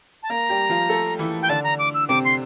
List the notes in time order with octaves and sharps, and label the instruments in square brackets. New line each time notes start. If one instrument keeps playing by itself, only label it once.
[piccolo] A5
[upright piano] A#3 [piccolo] A#5
[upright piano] G3 G4
F3 F4
A3 A4
E3 E4
[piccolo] G5
[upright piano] D3 D4 [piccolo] A5
[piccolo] A#5
D6
E6
[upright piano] C3 C4 [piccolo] D6
[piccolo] C6